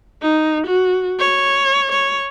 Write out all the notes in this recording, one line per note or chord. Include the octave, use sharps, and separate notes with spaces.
D#4
F#4
C#5
C#5